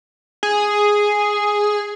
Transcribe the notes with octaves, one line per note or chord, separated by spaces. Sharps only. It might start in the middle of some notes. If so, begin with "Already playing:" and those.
G#4